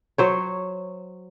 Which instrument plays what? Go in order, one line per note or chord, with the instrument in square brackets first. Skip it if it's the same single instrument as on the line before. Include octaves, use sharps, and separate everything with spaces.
[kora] F#3 C5 C#5